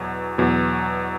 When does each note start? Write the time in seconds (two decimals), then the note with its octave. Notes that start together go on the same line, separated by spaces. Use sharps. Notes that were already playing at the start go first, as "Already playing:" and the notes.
Already playing: E2 B2 F#3
0.38 E2 B2 F#3